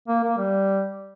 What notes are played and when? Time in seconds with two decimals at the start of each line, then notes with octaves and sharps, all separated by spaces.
0.08 A#3
0.23 A#3
0.38 G3